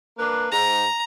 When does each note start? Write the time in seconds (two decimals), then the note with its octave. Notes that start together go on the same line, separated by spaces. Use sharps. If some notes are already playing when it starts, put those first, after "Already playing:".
0.18 A#3 D4 B4
0.52 G#2 A#5